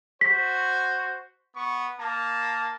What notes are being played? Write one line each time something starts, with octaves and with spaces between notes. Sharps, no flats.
F#4 C5 B6
B3 C#6
A#3 A5